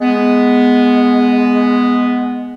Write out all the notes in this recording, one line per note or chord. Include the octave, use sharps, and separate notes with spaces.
G#3 B3